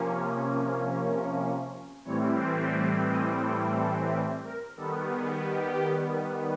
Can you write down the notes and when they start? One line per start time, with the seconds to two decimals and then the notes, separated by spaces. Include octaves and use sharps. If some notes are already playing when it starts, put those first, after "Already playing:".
Already playing: C3 F3 A#3 C#4
2.05 A2 E3 G3 C4 C#5
2.39 C5
2.74 D5
3.07 D#5
3.41 A4
3.76 A4
4.44 A#4
4.77 D#3 G3 B3 A4
5.11 G#4
5.44 G4